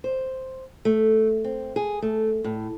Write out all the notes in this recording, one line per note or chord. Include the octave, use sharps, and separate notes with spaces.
C5
A3
C4
G#4
A3
A2